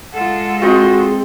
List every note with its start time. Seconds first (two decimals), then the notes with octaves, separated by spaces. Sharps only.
0.13 G#3 F4 A4 F#5
0.62 C4 F#4 G#4 D#5